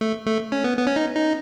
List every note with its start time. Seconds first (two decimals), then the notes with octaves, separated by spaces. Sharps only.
0.01 A3
0.26 A3
0.52 C#4
0.64 B3
0.77 B3
0.87 C#4
0.96 D#4
1.15 D#4